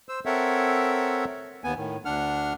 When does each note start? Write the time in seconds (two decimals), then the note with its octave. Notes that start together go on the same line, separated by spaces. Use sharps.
0.09 C5 E6
0.26 C4 A4 A#4 C#5 E5 F#5
1.64 D#2 B3 G#5
1.77 A2 D#3
2.05 D2 D4 F#5 F6